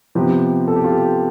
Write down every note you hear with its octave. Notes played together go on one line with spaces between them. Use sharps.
C3 F3 B3 G4
A4
G4
F4
G4